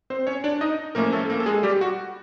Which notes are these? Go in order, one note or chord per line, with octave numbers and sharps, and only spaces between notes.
C4 C5
C#4 C#5
D4 D5
D#4 D#5
A2 F3 A3 A#3 C#4 A#4
A3 A4
A#3 A#4
A4
G#3 G#4
G3 G4
F#4